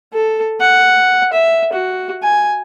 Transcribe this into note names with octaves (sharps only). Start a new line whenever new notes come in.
A4
F#5
E5
F#4
G#5